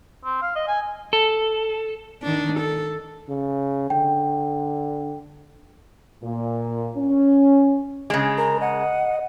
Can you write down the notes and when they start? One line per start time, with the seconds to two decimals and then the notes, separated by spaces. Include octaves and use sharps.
0.25 C4
0.42 F5
0.55 D#5
0.68 G#5
1.13 A4
2.22 D#3 D4
2.60 A4
3.28 C#3
3.90 D3 G5
6.23 A#2
6.97 C#4
8.10 C#3 G#3
8.38 A#4 A#5
8.61 D#5 F#5